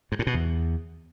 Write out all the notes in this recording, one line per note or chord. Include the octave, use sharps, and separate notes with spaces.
G#2
A2
B2
E2